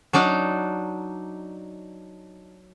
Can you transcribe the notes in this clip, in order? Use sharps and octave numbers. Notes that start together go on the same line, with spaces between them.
F#3 D4 D#4 D5